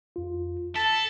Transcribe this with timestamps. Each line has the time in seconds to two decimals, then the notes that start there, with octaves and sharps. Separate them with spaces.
0.16 F2 F4
0.76 A4 A5 B6